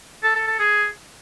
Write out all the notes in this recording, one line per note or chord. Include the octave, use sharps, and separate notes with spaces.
A4
A4
A4
G#4